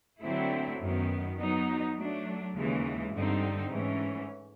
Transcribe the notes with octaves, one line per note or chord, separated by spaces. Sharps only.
D3 F#3 A3 C4 E4
F#2 D#3 F#3 B3
F#3 B3 D#4
F#3 A3 D4
D#2 C#3 E3 G#3
G2 D3 G3 C4 D#4
G#2 E3 A3 C#4